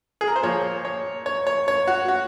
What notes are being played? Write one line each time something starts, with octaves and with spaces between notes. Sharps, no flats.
G#4
A#4
C5
A#2 F3 A#3 C#5
C#5
C#5
C#5
C#5
F#4
F#4